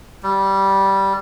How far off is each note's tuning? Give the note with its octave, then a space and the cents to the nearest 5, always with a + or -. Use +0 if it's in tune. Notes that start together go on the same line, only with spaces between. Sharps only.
G3 -10